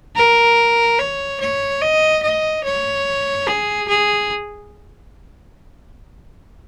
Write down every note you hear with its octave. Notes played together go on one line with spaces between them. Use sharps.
A#4
C#5
C#5
D#5
D#5
C#5
G#4
G#4